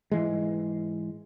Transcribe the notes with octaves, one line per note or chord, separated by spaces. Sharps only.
G#2 E3 G#3